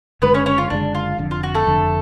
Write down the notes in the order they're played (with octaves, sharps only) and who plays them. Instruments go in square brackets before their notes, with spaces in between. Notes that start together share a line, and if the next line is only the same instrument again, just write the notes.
[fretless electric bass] F#1 F#2 D3 G#3 [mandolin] B3 B4
[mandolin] C#4 C#5
C#4 C#5
F4
[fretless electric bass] F#1 F#2 D3 G#3 [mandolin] D4
[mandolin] F4
[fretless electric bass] F1 F2 D3
[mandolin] F4
F#4
A3 A4
[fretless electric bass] F1 F2 D3